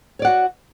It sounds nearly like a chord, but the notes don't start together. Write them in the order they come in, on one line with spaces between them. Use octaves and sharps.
C#5 D5 F#5 F#4